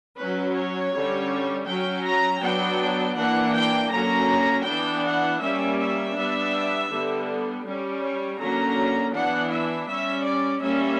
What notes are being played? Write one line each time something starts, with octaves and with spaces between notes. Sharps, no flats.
F#3 C#4 B4
C#5
D3 G3 C#4
F#3 C#4 G5
A#5
F#3 B3 D4 G5
E3 A#3 D4 F#5
G5
D3 F#3 A#3 C#4 A#5
E3 B3 D4 G5
F#5
G3 A#3 C#4 E5
E5
G3 B3 D4
D3 G3 B3
G3 C#4
C#5
D3 F#3 A#3 C#4 A#5
E3 B3 D4 F#5
E5
G3 C#4 E5
D5
G3 A#3 C#4 E5